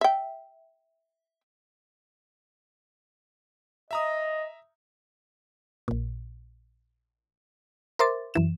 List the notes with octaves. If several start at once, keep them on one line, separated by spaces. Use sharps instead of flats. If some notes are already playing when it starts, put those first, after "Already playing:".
E5 G5
D#5 E5 A#5 D#6
A#1 A#2
A#4 C5 E5 C6 D6 A6
F#2 E3 E7